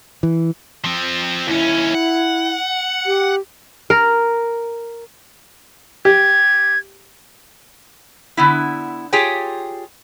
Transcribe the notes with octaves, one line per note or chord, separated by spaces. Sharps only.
E3
F3 C4
D#2 C#4 E4
F#5
G4
A#4
G4 G#6
D3 B3 E4
F4 G4 G#4 C#5 G5